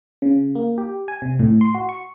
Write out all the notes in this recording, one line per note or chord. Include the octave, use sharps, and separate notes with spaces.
C#3
A#3
G4
G#5
C3
A2
C6
F#4
C#6